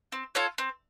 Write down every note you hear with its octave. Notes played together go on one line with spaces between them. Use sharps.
C4
F4 A4 C#5
C4